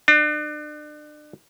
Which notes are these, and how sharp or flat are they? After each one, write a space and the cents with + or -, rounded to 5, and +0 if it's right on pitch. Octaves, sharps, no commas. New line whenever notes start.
D4 +35